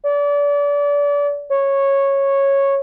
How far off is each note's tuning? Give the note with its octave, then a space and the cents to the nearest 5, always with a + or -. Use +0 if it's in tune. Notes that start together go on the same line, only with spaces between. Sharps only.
D5 -30
C#5 -10